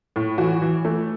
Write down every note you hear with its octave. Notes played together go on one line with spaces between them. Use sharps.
A2
E3 F#4
E3
A3